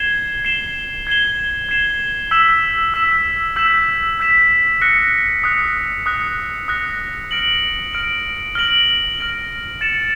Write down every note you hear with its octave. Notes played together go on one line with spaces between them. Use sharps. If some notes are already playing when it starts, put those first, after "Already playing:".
Already playing: G#6 C7 E7 G7
G#6 C7 E7 G7
G#6 C7 E7 G7
G#6 C7 E7 G7
E6 G6 B6 E7
E6 G6 B6 E7
E6 G6 B6 E7
E6 G6 B6 E7
D#6 F#6 A#6 C#7
D#6 F#6 A#6 C#7
D#6 F#6 A#6 C#7
D#6 F#6 A#6 C#7
F6 A#6 D7 F#7
F6 A#6 D7 F#7
F6 A#6 D7 F#7
F6 A#6 D7 F#7
A6 C#7 E7